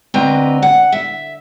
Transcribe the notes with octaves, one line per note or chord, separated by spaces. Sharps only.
D2 C4 B4 D5 D#5 A#5
F#5
E5